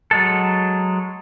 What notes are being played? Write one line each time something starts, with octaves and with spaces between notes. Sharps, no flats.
F#3 G#3 A4